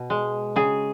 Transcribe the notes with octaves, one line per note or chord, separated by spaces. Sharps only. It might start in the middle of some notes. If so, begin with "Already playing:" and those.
Already playing: B2
G#3
C#3 G#4